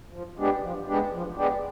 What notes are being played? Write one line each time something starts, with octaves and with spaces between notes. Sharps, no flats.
F3
G#3 B3 D4 G4
F3
G#3 B3 D4 G4
F3
G#3 B3 D4 G4